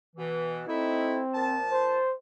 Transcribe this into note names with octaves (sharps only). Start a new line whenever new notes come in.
B2 E3
A3 C4 D#4 E4
A#2 F3 A5
C5